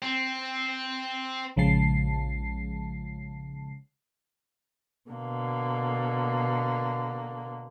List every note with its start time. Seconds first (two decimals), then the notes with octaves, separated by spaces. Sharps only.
0.02 C4
1.56 A#1 C#3 F3 G#3 A5 C7
5.10 B2 D3 A#3